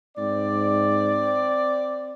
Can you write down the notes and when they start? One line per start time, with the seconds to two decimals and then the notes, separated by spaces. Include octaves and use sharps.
0.18 G#2 C4 D5